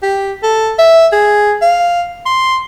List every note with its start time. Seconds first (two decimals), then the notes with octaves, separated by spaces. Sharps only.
0.03 G4
0.43 A4
0.78 E5
1.12 G#4
1.62 F5
2.26 C6